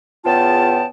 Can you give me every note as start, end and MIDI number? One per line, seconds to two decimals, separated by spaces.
0.24 0.84 40
0.24 0.84 49
0.24 0.84 59
0.24 0.84 65
0.24 0.84 79
0.24 0.84 81